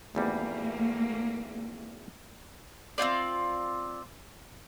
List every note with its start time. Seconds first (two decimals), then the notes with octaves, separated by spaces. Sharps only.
0.15 G#1 E2 G3 A3 A#3
2.98 C4 E4 F4 D5